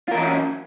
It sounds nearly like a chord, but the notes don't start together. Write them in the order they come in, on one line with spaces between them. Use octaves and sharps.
F4 A#4 E3 F#3 C#4